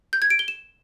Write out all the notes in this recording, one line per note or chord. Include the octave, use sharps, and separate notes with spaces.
G6
G#6
D7
G7
E7